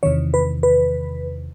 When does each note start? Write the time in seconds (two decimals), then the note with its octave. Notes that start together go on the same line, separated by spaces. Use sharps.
0.03 E2 C3 D#3 C#5
0.34 B4
0.63 B4